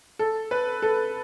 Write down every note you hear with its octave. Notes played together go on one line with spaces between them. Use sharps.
A4
B4
A4